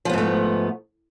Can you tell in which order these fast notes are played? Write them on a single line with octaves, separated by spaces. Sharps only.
F3 B3 G#2 A3